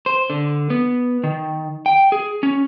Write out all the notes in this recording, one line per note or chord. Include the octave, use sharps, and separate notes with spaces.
C5
D3
B3
D#3
G5
G#4
C#4